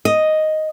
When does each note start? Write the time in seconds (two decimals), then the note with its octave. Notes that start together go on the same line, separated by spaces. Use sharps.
0.05 D#5